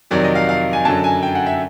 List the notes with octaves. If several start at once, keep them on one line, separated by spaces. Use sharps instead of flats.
F2 C3 D#3 F#3 D5
D#5
F5
F5
G#5
F#2 D3 F#3 A5
G#5
G5
F#5
E5